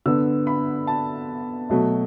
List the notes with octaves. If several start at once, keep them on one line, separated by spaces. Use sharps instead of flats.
D3 B3 E6
B5
A5
B2 F#3 A3